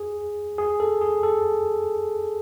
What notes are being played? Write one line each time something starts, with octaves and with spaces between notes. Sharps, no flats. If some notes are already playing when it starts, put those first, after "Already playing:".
Already playing: G#4
G#4
A4
G#4
A4